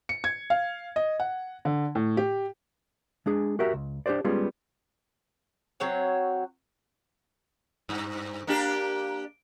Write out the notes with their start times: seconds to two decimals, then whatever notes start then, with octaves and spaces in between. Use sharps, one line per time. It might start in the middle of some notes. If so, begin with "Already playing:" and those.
0.09 C#7
0.24 G#6
0.50 F5
0.96 D#5
1.20 F#5
1.65 D3
1.95 A2
2.17 G4
3.26 G#3 D4 G#4
3.59 F#4 G4 A#4 E5
3.74 C#2
4.06 D4 G4 G#4 C5 D5
4.25 G3 G#3 B3 C#4 F4 G#4
5.80 F#3 C4 C#5 F#5
7.89 G2
8.47 A#3 D4 G4